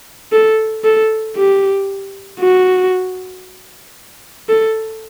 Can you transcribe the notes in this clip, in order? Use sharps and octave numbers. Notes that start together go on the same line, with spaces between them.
A4
A4
G4
F#4
A4